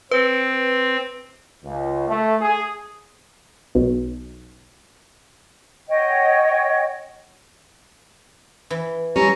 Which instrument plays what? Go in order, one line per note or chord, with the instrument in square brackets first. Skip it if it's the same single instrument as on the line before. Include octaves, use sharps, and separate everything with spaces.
[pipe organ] C4 [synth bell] B4
[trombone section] C#2
A3
G#4
[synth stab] B1
[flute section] C#5 D#5 F#5 G5
[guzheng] E3
[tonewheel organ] G3 [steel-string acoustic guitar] C#4 E4 [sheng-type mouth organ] A#5 C#6